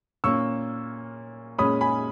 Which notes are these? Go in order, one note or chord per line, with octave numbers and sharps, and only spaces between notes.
A#2 A#3 C#4 C#6 E6
A#2 G#3 C#4 B5 D#6
G#5 B5